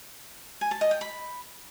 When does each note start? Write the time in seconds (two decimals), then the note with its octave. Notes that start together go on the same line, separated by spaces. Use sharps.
0.61 G#5
0.71 A5
0.81 D#5
0.91 G5
1.01 B5